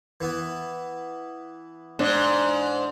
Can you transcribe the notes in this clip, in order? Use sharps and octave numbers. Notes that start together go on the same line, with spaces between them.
E3 B3
G#2 D4